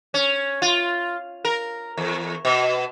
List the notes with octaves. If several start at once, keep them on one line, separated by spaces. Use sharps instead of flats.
C#4
F4
A#4
E2
B2